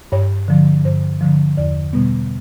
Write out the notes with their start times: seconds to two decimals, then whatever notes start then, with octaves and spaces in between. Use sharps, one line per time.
0.12 G2 C#5
0.48 D3 F3
0.85 G2 C5
1.21 D3 F3
1.57 E2 D5
1.93 B2 G3 B3